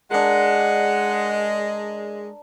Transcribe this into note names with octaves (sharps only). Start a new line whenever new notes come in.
G#3 D4 A#4 F#5